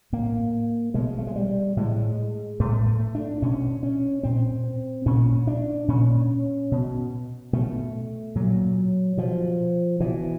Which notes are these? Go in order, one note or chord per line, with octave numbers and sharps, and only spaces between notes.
A2 A#3
B2 G#3
A3
G#3
G3
A2 G#3
A2 A3
A3
D4
B2 C#4
C#4
A#2 C4
A#2 C#4
D4
A#2 C#4
B2
B2 A3
A#2 F#3
B2 F3
B2 E3